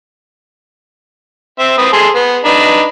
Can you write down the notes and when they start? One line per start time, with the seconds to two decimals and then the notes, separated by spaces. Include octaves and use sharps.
1.59 C4 E5
1.78 C4 B4 D#6
1.93 G#4 A4 C6
2.15 B3
2.45 D4 D#4 B4